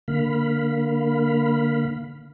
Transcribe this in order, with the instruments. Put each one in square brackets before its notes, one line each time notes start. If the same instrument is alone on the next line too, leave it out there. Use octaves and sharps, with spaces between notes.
[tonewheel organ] D3 A#3 F5 B5